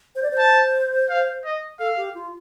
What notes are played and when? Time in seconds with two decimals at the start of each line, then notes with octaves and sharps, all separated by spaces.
0.15 C5
0.23 D5
0.31 C5
0.38 A5
1.10 F5
1.45 D#5
1.79 A4 F5
1.97 G4
2.14 F4